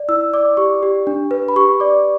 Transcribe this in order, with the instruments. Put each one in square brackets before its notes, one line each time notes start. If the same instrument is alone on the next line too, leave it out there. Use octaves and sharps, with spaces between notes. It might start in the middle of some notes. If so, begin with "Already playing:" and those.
Already playing: [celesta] D5
E4 E6
D5 D6
G4 C#6
G4
D4
B4
B5
G4 C#6
D5 D6